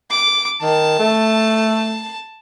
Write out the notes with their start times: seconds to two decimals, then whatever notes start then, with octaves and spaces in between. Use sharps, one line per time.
0.10 D6
0.62 D#3 A5
0.99 A3